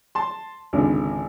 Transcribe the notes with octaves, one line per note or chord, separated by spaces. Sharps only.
A5 C6
G#1 C#2 D3